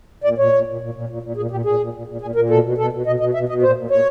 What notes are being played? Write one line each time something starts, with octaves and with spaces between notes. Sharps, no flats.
A#2 D5
A#2 C#5
A#2
A#2
A#2
A#2
A#2
A#2
A#2 G#4
A#2 G4
A#2 G#4
A#2
A#2
A#2
A#2 G#4
A#2 A#4
B2 A4
B2
B2 A4
B2
B2 D#5
B2 D#5
B2 E5
B2 D#5
A#2 C5
A#2
A#2 C#5